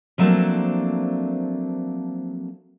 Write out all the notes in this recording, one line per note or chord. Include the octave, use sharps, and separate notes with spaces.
F3 F#3 A3 A#3 C4 D4